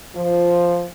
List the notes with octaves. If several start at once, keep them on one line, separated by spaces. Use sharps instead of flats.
F3